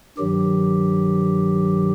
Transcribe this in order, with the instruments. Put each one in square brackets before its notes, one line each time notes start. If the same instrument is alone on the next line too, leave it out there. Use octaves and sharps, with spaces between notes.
[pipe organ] G2 D#3 F#3 G4